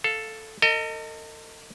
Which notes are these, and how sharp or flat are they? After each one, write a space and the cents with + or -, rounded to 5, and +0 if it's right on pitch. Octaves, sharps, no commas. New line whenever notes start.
A4 +0 F5 +0
A4 +45 D#5 +0